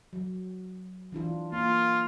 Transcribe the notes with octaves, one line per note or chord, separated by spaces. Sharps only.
F#3
E3 D4 F4
A#3 F4